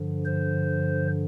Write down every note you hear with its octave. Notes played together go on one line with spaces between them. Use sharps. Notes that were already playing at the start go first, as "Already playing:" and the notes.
Already playing: G2 D3 F3
C5